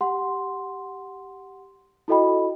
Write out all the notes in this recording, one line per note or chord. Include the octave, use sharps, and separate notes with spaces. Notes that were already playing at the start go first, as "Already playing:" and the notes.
G4 F#5 C6
E4 F#4 A4 D#5 G5 B5